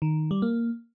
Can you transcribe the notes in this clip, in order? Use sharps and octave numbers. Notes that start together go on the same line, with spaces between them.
D#3
G3
A#3